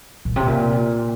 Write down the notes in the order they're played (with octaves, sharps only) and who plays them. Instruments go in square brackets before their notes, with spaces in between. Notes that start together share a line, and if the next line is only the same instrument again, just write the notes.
[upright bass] A#2
C3
A#2